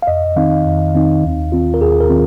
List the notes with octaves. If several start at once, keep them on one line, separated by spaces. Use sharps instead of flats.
F5
F2 D#5
D#3 C4 D#4 F5
F2
D#3 C4 D#4
D#2
D#3 C4 F4
A#4
D#2 G#4
A#4
D#3 C4 F4